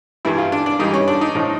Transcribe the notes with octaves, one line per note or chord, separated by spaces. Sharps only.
G2 E3 G3 E4
F4
D4
D4
G2 E3 G3 D#4
C#4
D4
D#4
A2 F3 D#4